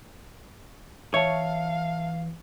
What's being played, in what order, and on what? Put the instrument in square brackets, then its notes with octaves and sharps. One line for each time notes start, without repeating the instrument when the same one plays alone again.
[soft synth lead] E3 [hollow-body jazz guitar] C#5 [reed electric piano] E5 A5 [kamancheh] F5